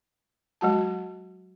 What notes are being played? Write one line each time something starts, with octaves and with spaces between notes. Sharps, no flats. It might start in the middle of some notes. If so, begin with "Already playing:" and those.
F#3 G#3 F#4 A5